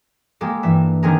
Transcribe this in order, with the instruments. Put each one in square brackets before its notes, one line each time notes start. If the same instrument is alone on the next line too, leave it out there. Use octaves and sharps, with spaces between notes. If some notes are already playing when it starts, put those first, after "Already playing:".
[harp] G#3 A#3 G4 A4
G2 E3 E5
D3 D#3 C4 G#4 A#4